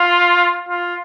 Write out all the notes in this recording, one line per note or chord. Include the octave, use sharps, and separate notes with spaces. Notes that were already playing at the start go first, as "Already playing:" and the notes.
Already playing: F4
F4